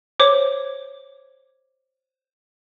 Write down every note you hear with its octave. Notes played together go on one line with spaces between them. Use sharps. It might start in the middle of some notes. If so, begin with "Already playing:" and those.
C5 C#5 D6